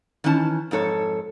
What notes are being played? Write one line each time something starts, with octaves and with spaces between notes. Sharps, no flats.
D#3 E3 C#4 A5
F2 G#2 A4 C#5